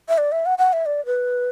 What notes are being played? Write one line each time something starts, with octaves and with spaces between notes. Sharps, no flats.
E5
D5
E5
F#5
F#5
E5
D5
B4